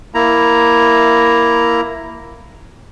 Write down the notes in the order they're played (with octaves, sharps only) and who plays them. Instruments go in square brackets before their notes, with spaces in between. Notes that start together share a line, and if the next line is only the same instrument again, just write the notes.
[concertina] A#3 E4 A#5